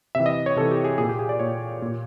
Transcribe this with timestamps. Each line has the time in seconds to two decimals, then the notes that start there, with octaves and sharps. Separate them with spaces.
0.15 C3 E3 E5
0.26 D#5
0.46 C#5
0.56 C3 E3 A4
0.71 G4
0.84 G#4
0.98 A#2 G#4
1.09 G4
1.19 G#4
1.29 D5
1.39 A#2 C#5
1.82 A#2